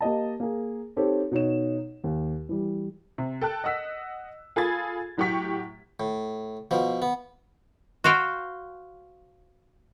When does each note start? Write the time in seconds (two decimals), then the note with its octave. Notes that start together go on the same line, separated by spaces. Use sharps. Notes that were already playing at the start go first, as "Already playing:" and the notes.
0.01 A#3 G4 D#5 A5
0.40 A#3 G#4
0.96 C4 D#4 G4 A4 C#5
1.31 B2 D#4 C#5 E7
2.04 D#2
2.49 E3 G3
3.18 C3
3.41 A4 G5 A5 F#6
3.64 D#5 F#5 E6 B6
4.56 F4 G#4 A4 B5 G#6 A6
5.17 A2 F#3 G4 F#5 C#6 B6
6.00 A2
6.71 B2 F3
7.02 B3
8.04 F#4 C5 F5 G5